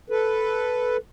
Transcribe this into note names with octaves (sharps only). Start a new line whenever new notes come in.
A4 B4